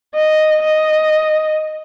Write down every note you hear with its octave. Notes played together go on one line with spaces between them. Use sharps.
D#5
D#5